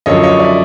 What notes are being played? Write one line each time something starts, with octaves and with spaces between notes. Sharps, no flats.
F#2 D3 F3 C#5 D#5
C#5 D#5
D5 E5